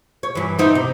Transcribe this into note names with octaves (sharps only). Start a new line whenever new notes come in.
C#5
G2 E3
C4 D#4 E4
C3